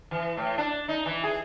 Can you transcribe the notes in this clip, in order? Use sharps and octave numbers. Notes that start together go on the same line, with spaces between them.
E3
A2
D4
D#4
E3
G#4